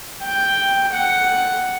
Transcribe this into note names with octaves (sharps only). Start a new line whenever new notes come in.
G5
F#5